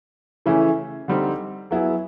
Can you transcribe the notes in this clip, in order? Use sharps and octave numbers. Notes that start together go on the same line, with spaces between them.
C#3 E3 A3 C#4 E4
D3 G3 C4 D#4 G4
F#3 B3 E4 G#4